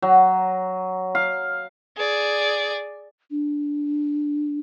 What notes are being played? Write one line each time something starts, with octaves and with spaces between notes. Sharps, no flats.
F#3
F5
G#4 D5
D4